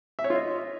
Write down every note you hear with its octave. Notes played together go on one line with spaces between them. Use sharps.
E5
C#5
F4
D#5